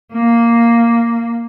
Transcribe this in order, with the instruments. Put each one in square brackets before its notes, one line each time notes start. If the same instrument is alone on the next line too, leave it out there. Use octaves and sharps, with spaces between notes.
[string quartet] A#3